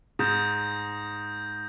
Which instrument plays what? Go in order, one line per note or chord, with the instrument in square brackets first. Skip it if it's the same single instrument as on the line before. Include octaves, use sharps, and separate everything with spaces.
[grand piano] G#2 [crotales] D#6 G6 A#6